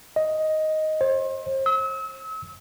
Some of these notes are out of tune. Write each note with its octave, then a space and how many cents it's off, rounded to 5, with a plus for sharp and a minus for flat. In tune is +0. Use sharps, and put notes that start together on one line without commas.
D#5 +5
C5 +35
E6 -40